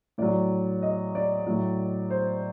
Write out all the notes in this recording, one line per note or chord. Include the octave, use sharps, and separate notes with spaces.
A2 F#3 D5
D#5
D5
A2 F#3
C5